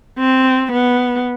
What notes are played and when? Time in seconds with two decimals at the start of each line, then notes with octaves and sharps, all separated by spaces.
0.18 C4
0.72 B3